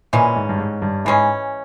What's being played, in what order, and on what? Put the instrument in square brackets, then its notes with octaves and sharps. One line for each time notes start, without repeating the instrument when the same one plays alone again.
[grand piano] A#2 [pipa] E3 G#3 C#4
[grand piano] G#2
G2
G#2
G2
[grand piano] G#2 [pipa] E3 G#3 C#4